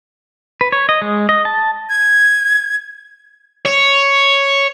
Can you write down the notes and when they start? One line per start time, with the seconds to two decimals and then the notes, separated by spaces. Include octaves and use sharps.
0.61 B4
0.72 C#5
0.89 D#5
1.02 G#3
1.29 D#5
1.45 A5
1.90 G#6
3.66 C#5